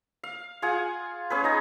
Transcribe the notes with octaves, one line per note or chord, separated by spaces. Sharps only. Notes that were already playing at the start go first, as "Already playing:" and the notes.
F5
F4 G#4 F#5 G#5
C#4 G#4 B4
D#4 D#5